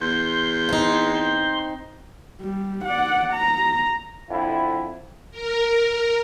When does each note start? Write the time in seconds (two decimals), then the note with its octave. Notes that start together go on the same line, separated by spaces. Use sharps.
0.01 E2 C6 G6
0.69 C4 D#4
2.41 G3
2.85 D5 F#5
3.33 A#5
4.29 F2 D3 E4
5.31 A#4